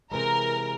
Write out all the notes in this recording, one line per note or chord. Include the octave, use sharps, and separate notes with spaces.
C3 E3 G#3 A#4